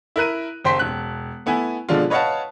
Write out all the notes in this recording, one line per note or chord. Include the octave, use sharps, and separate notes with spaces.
E4 A#4 F#6 D#7
F#1 C5 G5 C6 B6
E1 F#6
A3 B3 E4 G#5
B2 D3 F3 G#3 D4 F4
B4 C#5 D#5 F5 F#5 A5